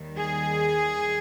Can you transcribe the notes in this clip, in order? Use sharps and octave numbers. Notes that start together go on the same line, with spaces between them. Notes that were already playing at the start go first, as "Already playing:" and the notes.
Already playing: D#2 D#3 G3
G#4